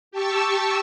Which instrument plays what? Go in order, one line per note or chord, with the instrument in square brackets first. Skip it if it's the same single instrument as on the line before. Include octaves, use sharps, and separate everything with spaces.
[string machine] G4 A5 C#6 E6